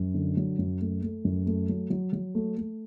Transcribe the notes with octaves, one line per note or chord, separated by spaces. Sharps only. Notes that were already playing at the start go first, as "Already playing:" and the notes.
Already playing: F#2
D3
F#3
F#2
A3
A3
F#2
A3
F#3
F#3
F#3
A3
A3